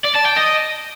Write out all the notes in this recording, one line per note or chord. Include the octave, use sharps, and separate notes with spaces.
D5
A5
G5
D#5